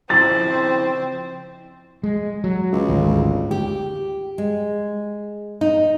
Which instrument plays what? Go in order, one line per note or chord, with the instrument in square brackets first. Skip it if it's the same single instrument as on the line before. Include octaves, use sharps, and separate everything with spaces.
[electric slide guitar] C#3 F3 E4 [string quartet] C4 [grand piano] A6
[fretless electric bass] G#3
F#3
[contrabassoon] C#2
[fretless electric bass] G#1 D2
[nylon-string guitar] G4
G#3
D#4